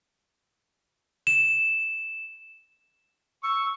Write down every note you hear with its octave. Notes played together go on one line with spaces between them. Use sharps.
E7
C#6 E6